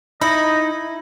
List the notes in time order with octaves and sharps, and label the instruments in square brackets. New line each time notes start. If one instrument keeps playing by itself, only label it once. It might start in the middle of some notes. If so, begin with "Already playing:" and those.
[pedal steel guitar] D#4 [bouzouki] E4 [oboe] D#5 [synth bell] B5